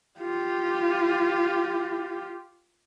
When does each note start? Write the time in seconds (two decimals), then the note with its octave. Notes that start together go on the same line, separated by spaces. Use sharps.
0.20 F4 G4